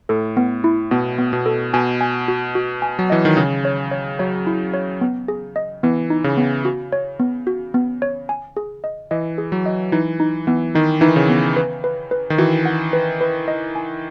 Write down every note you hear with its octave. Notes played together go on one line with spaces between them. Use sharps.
A2 A4
B3
E4
B2 B3
B3
B2
A4
B2 G#5
G#5
F#4
F#4
G#5
F#3
E3 D#5
D#3
C#3 G#4
C#5
C#5
F#3 C#5
E4
C#5
B3
G#4
D#5
E3 B3
D#4
C#3
B3
F#4
C#5
B3
F#4
B3
C#5
G#5
G#4
D#5
E3 D#5
G#4
F#3
D#5
E3 D#4
D#4
E3 B3
D#3 D#4
E3 D#4
D#3
C#3
B3
B4
B4
B4
D#3
E3 F#4
F#5
B4
B4
D#5
G#5